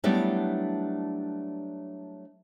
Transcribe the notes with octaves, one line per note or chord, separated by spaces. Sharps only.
F#3 G3 A3 B3 D4 E4